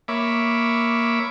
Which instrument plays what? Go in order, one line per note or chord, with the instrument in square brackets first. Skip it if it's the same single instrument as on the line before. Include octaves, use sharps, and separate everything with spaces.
[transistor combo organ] A#3 C#5 E5 B5 D6